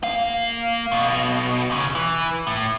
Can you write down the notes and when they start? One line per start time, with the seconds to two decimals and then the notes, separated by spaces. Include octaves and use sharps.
0.03 A#3 F5
0.92 B1 B2
1.70 D#2 C#3
1.95 E3
2.47 A2